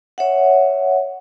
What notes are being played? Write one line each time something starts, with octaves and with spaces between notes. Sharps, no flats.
C#5 E5 F#5